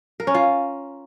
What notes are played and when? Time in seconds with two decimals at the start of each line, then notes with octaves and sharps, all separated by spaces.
0.20 A#4
0.27 C#4
0.34 F4